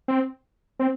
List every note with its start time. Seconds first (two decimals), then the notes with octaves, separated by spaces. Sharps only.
0.08 C4
0.79 C4